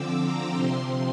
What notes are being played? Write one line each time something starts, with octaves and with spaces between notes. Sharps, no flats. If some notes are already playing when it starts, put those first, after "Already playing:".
Already playing: D3 F3 C4 D6 E6
A#5
C3 F3 C4 C6